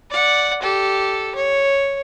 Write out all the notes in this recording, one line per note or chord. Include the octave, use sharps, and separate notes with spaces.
D5 F#5
G4 A4
C#5